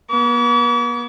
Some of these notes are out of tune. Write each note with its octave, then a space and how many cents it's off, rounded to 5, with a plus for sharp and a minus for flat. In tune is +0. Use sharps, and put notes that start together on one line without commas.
B3 -40 D6 -45